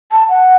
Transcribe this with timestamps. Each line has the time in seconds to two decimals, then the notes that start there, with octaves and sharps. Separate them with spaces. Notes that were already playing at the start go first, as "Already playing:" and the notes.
0.11 A5
0.29 F#5